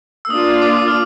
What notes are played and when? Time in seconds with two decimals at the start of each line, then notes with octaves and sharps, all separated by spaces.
0.25 E6
0.30 A#3 D4 F4 D#6
0.61 D6
0.77 D#6
0.88 F6